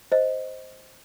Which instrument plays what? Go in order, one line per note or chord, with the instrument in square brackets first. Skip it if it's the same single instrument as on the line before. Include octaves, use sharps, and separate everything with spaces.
[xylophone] C5 D#5